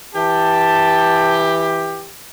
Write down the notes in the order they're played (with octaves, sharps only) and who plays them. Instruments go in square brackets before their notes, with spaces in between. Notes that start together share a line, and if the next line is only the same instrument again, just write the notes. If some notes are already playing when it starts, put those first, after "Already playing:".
[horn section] E3 G4 [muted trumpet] A5